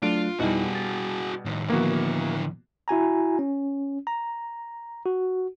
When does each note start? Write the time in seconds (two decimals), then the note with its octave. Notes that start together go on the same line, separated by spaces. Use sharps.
0.03 F#3 A3 D4 F4 D7
0.40 F2 B2 G3 D#4 E4 F#4 G#4
0.75 A6
1.45 A2 D#3
1.70 A2 D3 D#3 F3 A#3 B3 E4 F#4
2.88 E4 F#4 G#5 A#5
3.39 C#4
4.07 A#5
5.06 F#4